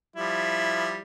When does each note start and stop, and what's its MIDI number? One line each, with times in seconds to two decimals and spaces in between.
0.16 1.01 53
0.16 1.01 55
0.16 1.01 64